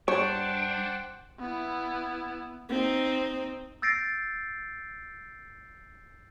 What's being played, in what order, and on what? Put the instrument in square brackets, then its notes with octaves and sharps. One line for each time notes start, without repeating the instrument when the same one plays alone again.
[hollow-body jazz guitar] G2 [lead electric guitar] D4 [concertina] C5 F#5 G5 [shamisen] C#5
[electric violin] B3 E4
[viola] C4 D#4
[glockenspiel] E6 G6 A6 A#6 C7 D7